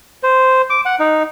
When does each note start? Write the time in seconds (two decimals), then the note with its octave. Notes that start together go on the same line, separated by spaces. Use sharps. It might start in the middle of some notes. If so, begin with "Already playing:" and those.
0.23 C5
0.70 D6
0.86 F#5
1.00 D#4